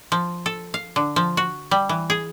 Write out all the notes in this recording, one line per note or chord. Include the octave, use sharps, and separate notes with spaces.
F3
A4
F5
D3
F3
F#4
G3
E3
G#4